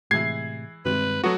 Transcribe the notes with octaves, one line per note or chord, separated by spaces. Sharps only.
A2 C3 E3 G#3 G#6 C7
G2 C3 D#3 G#3 B4
F#3 A3 B3 F#4